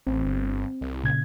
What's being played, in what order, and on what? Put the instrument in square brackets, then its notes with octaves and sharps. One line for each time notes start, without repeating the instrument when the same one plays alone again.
[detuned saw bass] A1 [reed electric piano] C4
[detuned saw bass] G1
C2
[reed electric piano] A#2 C#3 G#6